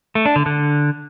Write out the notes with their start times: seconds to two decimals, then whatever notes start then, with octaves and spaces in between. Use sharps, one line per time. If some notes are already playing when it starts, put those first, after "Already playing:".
0.15 A3
0.26 D4
0.36 D3
0.46 D3